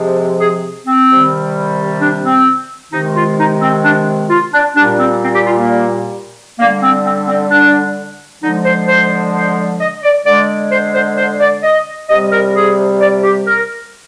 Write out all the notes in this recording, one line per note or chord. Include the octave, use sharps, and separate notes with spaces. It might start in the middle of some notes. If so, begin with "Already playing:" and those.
Already playing: C3 F3 G#3
G#4
C4
C3 D#3 G3
D4
C4
C3 D#3 G#3 D#4
F4
D#4
C4
D4
F4
D4
A#2 G3 D4
C4
C4
G4
F4
A#3
D3 G3 A#3
C4
C4
C4
D4
D3 F3 G#3 D#4
C5
C5
C5
D#5
D5
D3 G#3 D5
C5
C5
C5
D5
D#5
C3 G3 D#5
A#4
G#4
D5
G4
A#4